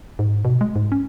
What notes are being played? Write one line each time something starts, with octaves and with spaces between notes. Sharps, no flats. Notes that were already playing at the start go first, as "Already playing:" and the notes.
G#2
B2
G#3
G#2
C#4